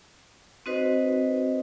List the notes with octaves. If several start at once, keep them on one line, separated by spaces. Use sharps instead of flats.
C4 D#4 F#4 B4 C5 D#5